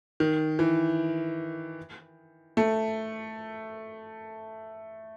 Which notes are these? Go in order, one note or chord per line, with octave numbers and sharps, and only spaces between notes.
D#3
E3
A3